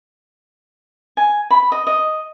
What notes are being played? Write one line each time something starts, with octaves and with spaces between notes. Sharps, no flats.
G#5
B5
D#5
D#5